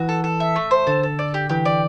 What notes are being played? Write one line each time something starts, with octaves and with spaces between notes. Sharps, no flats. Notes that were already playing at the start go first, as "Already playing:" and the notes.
Already playing: E3 F#4
A4
A4
E5
A3
C5
D3 A4
A4
D5
G4
E3 G4
D5